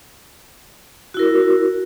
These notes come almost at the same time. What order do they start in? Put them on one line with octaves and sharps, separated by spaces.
F#4 E4 A#4